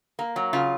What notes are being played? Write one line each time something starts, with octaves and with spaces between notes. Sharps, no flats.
A#3
F#3
C#3 F4